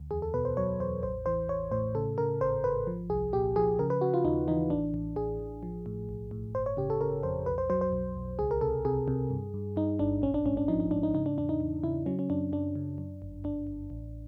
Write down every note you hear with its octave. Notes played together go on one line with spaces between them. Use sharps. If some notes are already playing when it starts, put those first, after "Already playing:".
Already playing: D2
E2 G#4
A4
B2 B4
C5
F#3 C#5
E2 C5
A1 C5
E3 C5
A1 C#5
A2 C5
C#3 A4
C#3 A#4
G#1 C5
G#1 B4
F3
C2 G#4
A#2 G4
F3 G#4
C#3 A#4
B4
C#3 F#4
F4
D#2 D#4
E3 D#4
A1 D4
A1
A1 G#4
A1
F3
A2
B1
A2
G1 C5
C#5
C#3 G4
A4
C#3 A#4
F2 C5
B1 B4
C5
F#3 C5
C5
B1
B1
C#2 G#4
A#4
C3 A4
C3 G#4
C3
G2
G2
G2 D#4
G1 D4
A#1 C#4
D4
G#2 C#4
D4
F3 D#4
D#4
G#2 D4
D#4
C#3 D#4
D4
E2 D4
D#4
E2
C#3 E4
F#3 C#4
C#4
F#2 D4
F#2 D4
C#3
F#2
G1
G1 D4
G1
A1